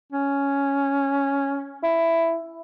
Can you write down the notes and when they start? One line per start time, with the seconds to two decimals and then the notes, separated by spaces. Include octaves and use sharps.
0.13 C#4
1.83 E4